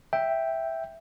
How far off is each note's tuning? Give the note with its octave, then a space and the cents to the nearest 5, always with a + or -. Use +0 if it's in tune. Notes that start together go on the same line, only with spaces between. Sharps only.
E5 +0 G5 +0